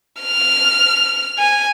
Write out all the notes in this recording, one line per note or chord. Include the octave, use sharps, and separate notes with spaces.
F6
G#5